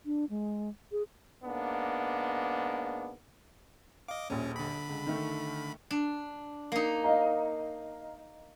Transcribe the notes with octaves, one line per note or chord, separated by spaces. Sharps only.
D4
G#3
G#4
G#2 A#3 B3 D4
D#5 F5 D6
D#1 A#1 C#4
D3 B5
C#2
D#3 A3
D4
A#3 D#4
D#5 F5 A#5